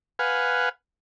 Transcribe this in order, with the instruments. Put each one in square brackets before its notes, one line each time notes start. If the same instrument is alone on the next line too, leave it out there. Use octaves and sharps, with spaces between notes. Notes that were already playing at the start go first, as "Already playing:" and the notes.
[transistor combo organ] B4 F5 F#5 G#5